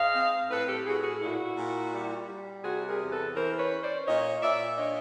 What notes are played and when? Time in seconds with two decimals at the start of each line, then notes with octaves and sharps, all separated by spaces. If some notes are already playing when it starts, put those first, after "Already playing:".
Already playing: G#2 D#5 F5
0.15 C4
0.50 A2 A4 B4
0.68 G4 A4
0.85 A2 F#4 G#4
1.03 F#4 G#4
1.21 A#2 E4 F#4
1.56 A#2
1.93 G3
2.28 G3
2.64 C3 F#4 G#4
2.87 G#4 A#4
3.00 E2
3.11 A4 B4
3.35 E3 A#4 C5
3.59 B4 C#5
3.70 C#4
3.83 C5 D5
4.06 A#2 C#5 D#5
4.41 A#2 D5 E5
4.77 D4 C#5 D#5